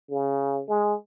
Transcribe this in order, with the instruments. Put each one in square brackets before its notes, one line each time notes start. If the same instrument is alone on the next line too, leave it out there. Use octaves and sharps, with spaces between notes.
[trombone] C#3
G#3